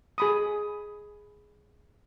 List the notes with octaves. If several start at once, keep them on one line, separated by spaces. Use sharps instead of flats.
G#4 B5 D#6